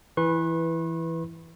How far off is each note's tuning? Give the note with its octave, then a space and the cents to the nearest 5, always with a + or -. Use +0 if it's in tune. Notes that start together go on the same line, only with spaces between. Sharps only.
E3 +0 B4 -5 C#6 -45